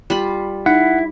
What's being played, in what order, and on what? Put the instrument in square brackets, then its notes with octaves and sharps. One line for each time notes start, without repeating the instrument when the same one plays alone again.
[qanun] G3 F4 B5
[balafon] D#4 [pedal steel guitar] E4 [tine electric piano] F#5